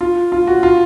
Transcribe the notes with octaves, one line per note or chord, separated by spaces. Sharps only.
F4
F4
F#4
F4